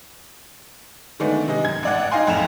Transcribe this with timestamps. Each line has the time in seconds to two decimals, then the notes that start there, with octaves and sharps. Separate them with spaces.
1.19 D3 D#3 G#3 A3 B3 D4
1.48 C3 G#3 D#5
1.64 F#2 G#6
1.83 A1 D5 F#5
2.11 D#4 D#5 F5 G5 G#5 C6
2.27 A1 F2 G#2 G#5 E7 F7